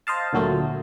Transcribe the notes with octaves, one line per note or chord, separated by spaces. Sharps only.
C5 D#5 F5 A5
D2 A#2 F#3 A3